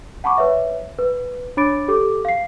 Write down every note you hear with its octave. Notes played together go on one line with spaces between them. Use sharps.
F#5 A5 B5 C#6 D6
B4 C#5 E5
B4
D4 C#5 B5 D6 A6 D7
G4 A4 D6
F5 C7